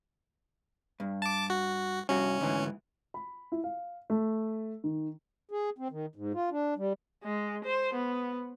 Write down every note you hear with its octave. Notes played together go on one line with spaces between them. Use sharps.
G2
A5 D6
F#4
C2 G2 C#4 F#4
D2 G#2 E3
B5
E4
F5
A3
D#3
G#4
C4
D#3
G#2
F4
D4
G3
G#3
C5
B3